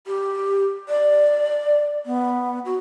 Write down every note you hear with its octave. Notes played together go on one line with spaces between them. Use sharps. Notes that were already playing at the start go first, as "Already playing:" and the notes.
G4
D5
B3
F#4